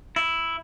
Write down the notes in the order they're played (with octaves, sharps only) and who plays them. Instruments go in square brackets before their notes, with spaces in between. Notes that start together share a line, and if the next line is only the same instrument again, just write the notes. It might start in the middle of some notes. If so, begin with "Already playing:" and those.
[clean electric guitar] E4